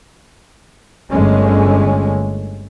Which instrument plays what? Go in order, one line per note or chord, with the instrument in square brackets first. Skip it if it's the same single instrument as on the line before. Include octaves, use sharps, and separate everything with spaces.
[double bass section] G1 D3 G#3 A3 C#4